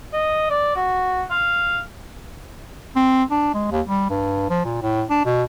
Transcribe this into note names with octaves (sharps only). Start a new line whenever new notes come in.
D#5
D5
F#4
F5
C4
D4
G#3
D#2
G3
G2
F3
A#2
A2
D4
B2